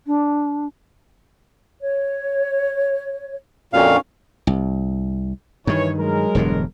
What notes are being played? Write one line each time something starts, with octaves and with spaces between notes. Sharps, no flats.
D4
C#5
F2 A#2 C#4 D4 F#4 F5
C2
G2 D#3 E3 C#5
F#3 G#3 A#4
E1 G2 D3